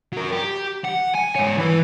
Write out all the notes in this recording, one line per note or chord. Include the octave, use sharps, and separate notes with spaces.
F#3 A#4
G4
F#5
G#5
G#2 C#5
E3 B4